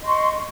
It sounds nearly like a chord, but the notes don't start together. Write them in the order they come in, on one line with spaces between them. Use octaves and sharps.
D#5 C6 C#6